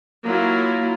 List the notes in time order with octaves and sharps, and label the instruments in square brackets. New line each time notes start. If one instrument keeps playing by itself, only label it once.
[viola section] F#3 A#3 E4 F4